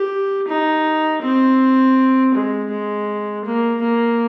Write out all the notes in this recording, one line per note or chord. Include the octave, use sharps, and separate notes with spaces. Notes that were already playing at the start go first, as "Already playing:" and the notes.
Already playing: G4
D#4
C4
G#3
G#3
A#3
A#3